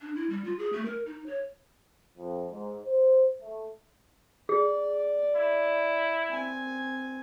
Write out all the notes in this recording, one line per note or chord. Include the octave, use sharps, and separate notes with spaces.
D4
E4
G3
F4
G#4
A3
A#4
D#4
C#5
F2
G#2
C5
A3
G#4 D5
E4
C4 G#5